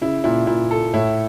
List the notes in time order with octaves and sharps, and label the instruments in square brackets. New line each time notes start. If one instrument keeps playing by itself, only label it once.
[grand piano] C#3 [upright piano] E4
[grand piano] A#2 [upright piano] E4
[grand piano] A#2 [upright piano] E4
[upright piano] A4
[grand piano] A2 [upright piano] E4